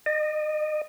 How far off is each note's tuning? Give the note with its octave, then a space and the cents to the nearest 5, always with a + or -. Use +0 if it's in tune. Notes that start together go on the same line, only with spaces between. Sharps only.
D#5 -30